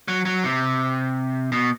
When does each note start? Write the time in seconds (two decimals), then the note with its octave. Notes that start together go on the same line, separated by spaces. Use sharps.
0.08 F#3
0.25 F#3
0.44 C3
1.52 B2